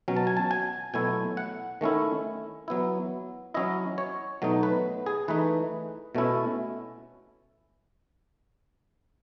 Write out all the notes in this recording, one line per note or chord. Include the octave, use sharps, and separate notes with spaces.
B2 F#3 C#4
A5
G#5
A5
G#5
B2 F#3 A3 E4 G#5
F#5
D#3 A3 C#4 E4
F#3 B3 E4
F#3 C#4 E4 D#5
C#5
B2 F#3 A3 D#4
B4
G#4
E3 A3 D#4 B4
B2 A3 C#4 E4